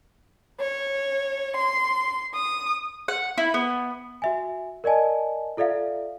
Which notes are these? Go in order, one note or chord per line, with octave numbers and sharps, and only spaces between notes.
C#5
C6
D#6
F#5
E4
B3
F#4 E5 G#5
A#4 D5 D#5 G#5 A5
F4 A4 D5 E5 F5